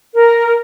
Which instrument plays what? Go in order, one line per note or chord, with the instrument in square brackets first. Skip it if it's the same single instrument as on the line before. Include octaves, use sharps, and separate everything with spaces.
[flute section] A#4